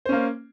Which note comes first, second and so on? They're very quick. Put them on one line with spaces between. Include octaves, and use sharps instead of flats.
C5 C#4 A#3